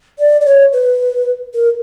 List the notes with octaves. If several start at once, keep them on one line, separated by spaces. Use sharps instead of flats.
D5
D5
C#5
B4
A#4